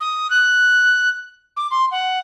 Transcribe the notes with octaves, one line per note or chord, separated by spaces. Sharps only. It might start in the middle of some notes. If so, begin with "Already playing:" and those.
D#6
F#6
D6
C6
F#5